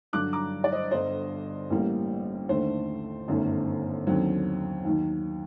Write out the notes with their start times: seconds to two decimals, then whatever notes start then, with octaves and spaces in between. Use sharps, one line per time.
0.13 G2 D3 F#3 D6 F#6
0.33 A#5 D6
0.64 D5
0.72 C5 D#5
0.91 G1 G2 D3 C5 D#5
1.70 A1 A2 G3 A#3
2.49 D#2 D3 A3 C5
3.28 G1 F#2 D#3 A3
4.07 D#2 D3 F#3 C4
4.84 D#2 D#3 F#3